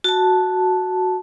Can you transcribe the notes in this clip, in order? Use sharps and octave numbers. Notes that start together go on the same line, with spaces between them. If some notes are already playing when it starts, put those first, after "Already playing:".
F#4 A5